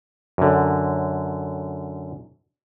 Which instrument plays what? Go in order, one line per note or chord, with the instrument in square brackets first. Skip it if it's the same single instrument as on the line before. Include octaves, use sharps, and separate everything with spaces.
[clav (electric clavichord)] F#2 D3